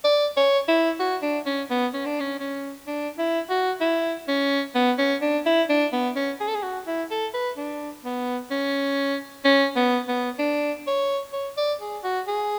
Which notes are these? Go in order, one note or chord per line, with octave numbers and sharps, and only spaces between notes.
D5
C#5
E4
F#4
D4
C#4
B3
C#4
D4
C#4
C#4
D4
E4
F#4
E4
C#4
B3
C#4
D4
E4
D4
B3
C#4
G#4
A4
G#4
F#4
E4
A4
B4
D4
B3
C#4
C#4
B3
B3
D4
C#5
C#5
D5
G#4
F#4
G#4